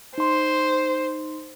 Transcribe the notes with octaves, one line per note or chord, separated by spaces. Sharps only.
D#4 C5 C6